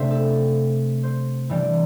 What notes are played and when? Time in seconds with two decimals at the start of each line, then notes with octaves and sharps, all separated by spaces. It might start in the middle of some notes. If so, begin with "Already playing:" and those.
Already playing: C3 A3 D4 C5 E5
0.11 A4
1.03 C5
1.49 E3 G3 D4